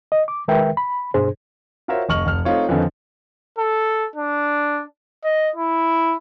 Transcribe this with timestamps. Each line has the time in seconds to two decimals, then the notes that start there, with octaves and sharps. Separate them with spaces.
0.12 D#5
0.28 D6
0.48 D#3 G#3 A#4 B4 E5 G5
0.77 B5
1.14 G2 B2 D4 G#4 C5
1.88 F4 F#4 A#4 C5 C#5 E5
2.09 F1 D#5 C#6 F6 F#7
2.26 F1 F6
2.45 A3 C4 D#4 F4 C#5
2.69 F2 D3 D#3 F3 B3 C#4
3.59 A4
4.16 D4
5.24 D#5
5.56 E4